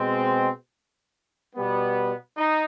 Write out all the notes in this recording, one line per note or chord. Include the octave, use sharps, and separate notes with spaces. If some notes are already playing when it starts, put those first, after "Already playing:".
Already playing: B2 G#3 C4
B2 G3 B3
D#4